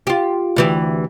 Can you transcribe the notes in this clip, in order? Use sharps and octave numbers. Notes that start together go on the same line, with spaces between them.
F4 G4
D2 E3 G4